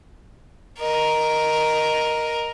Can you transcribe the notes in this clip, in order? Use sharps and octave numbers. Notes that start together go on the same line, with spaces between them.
A#4 D#5